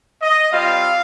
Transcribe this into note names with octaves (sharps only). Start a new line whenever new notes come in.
D#5
G3 C4 F4 F5